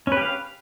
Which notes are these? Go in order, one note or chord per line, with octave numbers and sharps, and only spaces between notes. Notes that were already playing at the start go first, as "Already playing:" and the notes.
C#4 G4 B4 F5